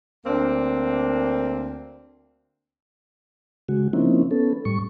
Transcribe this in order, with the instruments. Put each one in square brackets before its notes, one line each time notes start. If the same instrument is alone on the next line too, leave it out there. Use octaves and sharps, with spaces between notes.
[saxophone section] D2 A#3 C4 D4
[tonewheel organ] C#3 G#3 F#4
F3 A#3 C4 C#4 D#4 E4
B3 C#4 A4
A2 G3 C#6